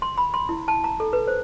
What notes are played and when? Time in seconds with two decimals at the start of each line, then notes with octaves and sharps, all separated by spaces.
0.02 C6
0.18 B5
0.34 C6
0.49 E4
0.68 A5
0.84 A#5
1.00 A4
1.13 B4
1.27 C5